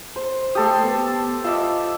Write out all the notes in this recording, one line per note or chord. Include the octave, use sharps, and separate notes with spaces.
C5
A3 G4 A4 C6 D#6
B3
F4 D#5 E5 D6